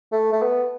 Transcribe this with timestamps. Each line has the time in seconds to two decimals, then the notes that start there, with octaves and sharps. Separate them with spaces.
0.12 A3
0.32 A3
0.42 B3